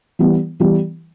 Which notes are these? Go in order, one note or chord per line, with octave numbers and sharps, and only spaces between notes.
E3 G3 B3
E3 G3 B3